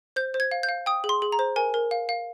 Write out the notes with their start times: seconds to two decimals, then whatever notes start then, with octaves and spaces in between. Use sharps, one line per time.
0.16 C5 G6
0.34 C5
0.40 G#6
0.51 F5
0.63 G6
0.69 F5
0.86 G5 D#6
1.04 G#4
1.09 C6
1.22 G#4
1.32 A#5
1.39 C5
1.56 A#4 G#5
1.74 A#4
1.91 F5
2.09 F5